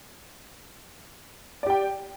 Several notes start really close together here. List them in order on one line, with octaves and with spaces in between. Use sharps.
D5 G4 G5